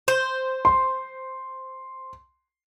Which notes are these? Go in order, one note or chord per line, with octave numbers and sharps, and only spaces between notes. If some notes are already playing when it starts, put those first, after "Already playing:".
C5
C6